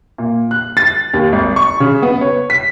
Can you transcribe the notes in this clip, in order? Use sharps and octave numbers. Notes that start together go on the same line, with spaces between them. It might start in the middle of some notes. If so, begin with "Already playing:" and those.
A#2
F#6
A6
D#2
G#1
C#6
C#3
B3
C#5
B6